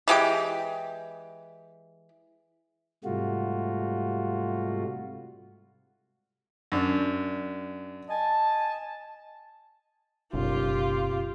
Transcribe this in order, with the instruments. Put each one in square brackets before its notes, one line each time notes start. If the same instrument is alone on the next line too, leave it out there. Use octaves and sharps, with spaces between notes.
[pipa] E3 G#3 G4 G5
[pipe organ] G#2 C3 G3 A3 F4 F#4
[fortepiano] F#2 D4
[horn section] D#5 G#5 A5
[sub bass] F#1 [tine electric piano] B1 F#2 [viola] F4 G4